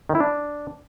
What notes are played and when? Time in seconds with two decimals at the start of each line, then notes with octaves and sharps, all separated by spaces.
0.09 D#3
0.15 E4
0.20 D4